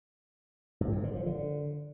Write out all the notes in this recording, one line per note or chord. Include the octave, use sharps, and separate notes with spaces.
G2
A2
D3
F3
D3